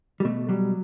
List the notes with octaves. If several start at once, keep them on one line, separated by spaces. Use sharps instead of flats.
G3
B2 A3
F#3 G3